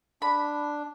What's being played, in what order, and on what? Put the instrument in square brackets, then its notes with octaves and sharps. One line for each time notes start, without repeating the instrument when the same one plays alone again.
[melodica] D4 [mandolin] B5